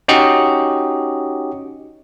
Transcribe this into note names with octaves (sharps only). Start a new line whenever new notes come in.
C#4 D#4 F#4 G4 D#5 C#7